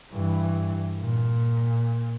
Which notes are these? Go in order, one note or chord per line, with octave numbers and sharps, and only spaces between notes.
G2 E3
A#2